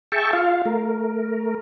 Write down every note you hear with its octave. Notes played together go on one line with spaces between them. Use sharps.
G#4 E5 G5 A5 C#6
F4 F5
A3 A#4